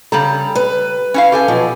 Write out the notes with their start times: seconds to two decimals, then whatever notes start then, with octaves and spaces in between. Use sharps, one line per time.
0.12 C#3 G3 A4 A#5
0.55 B4
1.14 C#4 E4 F5
1.32 G4 A4 G#5
1.48 B2 F3 F#3